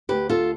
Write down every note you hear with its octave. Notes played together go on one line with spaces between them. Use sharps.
D2 G4 B4
F4 A4